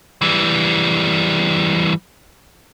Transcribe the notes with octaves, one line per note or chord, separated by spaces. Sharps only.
E3 G3